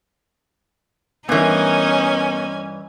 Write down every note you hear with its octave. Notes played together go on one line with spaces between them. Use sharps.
G2 E3 B3 C#4 D#4 A#4 G#5